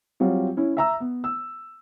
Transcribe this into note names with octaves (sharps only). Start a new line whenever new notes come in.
F#3 G3 C4 F4
C#4 E4
E5 A#5 E6
B3
E6